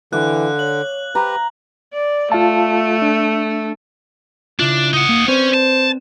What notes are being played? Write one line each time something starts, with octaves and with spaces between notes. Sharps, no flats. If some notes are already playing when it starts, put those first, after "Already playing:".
D3 E3 F5 D6 F#6
C#5 F#7
G4 B4 A#5
D5
A3 F4 F5 A5
D4
C#3 D4 E4 F4
D#4 F#5 D#6
A#3
C4 C#4 B4 C5 D5
A5